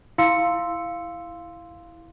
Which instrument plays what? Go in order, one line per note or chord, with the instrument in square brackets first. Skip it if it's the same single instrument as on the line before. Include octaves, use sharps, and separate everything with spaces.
[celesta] E4 F5 C6 E6 C#7